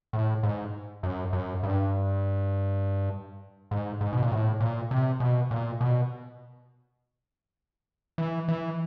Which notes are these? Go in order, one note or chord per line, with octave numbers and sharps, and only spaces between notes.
A2
G#2
F#2
F#2
G2
G#2
G#2
B2
A#2
A2
A#2
C3
B2
A#2
B2
E3
E3